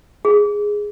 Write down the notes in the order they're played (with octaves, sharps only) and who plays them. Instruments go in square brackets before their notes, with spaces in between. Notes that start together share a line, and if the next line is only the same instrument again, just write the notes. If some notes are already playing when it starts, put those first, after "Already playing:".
[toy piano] G#4